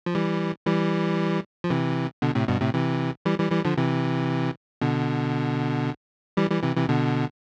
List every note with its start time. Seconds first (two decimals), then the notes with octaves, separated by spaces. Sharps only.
0.06 F3
0.15 E3 G3
0.66 E3 G3
1.64 F3
1.70 C3 E3
2.22 B2 D3
2.35 A2 C3
2.48 G2 B2
2.61 A2 C3
2.74 C3 E3
3.26 E3 G3
3.39 E3 G3
3.52 E3 G3
3.65 D3 F3
3.77 C3 E3
4.81 B2 D3
6.37 E3 G3
6.50 E3 G3
6.63 C3 E3
6.76 C3 E3
6.88 B2 D3